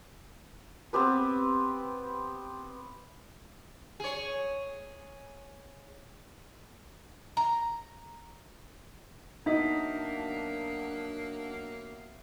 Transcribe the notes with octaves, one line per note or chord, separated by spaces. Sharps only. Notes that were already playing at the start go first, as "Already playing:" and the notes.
B3 C4 G4 B4
G#4 C#5
A#5
F#3 A#3 B3 D4 D#4 E5 D#6